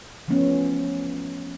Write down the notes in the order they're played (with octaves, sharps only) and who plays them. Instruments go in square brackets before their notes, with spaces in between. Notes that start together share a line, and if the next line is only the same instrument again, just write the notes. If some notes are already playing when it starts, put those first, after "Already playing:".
[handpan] E3 F3 A3 B3 C#4